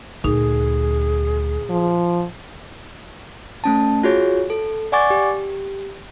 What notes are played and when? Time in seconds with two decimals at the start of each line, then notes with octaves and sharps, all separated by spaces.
0.24 D2 A#2 D#4 G#4
1.70 F3
3.64 A3 C#4 A5
4.03 F4 F#4 G#4 C#5
4.50 A4
4.92 D5 F#5 G#5 C#6 D6 A6
5.10 G4